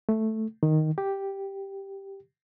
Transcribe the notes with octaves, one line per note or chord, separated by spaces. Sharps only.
A3
D#3
G4